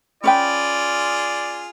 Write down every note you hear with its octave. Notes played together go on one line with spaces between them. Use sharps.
C#4 F4 G#4 B4 D5 G5